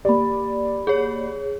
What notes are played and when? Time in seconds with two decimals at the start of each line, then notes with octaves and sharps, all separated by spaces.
0.05 A#3 G4 D5 B5
0.87 G#4 C#5